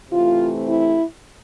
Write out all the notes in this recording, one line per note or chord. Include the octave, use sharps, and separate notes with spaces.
C3 E3 A3 C4 F4
E4